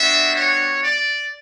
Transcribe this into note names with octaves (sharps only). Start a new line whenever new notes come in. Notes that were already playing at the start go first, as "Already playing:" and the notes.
Already playing: G3 B3 D4 F#4 E5
C#5
D5